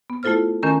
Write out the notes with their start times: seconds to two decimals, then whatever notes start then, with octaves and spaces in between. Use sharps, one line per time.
0.10 B3
0.23 A3 E4 F4 A4 C5 F6
0.63 D#3 A3 C#4 A#4 G#5 A#5